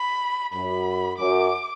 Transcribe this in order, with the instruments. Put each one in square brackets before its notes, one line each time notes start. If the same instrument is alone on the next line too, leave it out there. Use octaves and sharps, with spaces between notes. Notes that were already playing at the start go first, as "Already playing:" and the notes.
Already playing: [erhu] B5
[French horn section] F#2 [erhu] B5
[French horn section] F#2 [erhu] D6